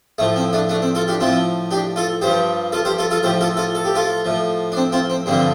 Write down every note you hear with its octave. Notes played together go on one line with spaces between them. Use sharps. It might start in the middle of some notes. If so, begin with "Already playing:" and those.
A2 F3 A3
C4
A3 D4
A3 D4
C4
F4 A4
D4 G4
A2 F3 C4 F4
D4 G4
F4 A4
G2 F3 G4 C5
F4 A4
G4 C5
F4 A4
F4 A4
A2 F3 G4 C5
F4 A4
F4 A4
A4
G4
F4 A4
A2 F3
D4
C4
C4 F4
C4
G2 D3 F3 C4